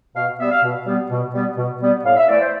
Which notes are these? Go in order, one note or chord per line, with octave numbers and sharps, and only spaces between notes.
B2 F5
G3 B3 E5
F5
B2
G3 B3
B2
G3 B3
B2
G3 B3
A2 F5
E5
E3 A3 D5
C5